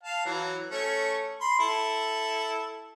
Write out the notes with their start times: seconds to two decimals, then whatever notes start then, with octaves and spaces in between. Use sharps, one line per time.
0.03 F5 A5
0.25 E3 F#3
0.71 A3 C#4
1.41 B5 C6
1.59 E4 A4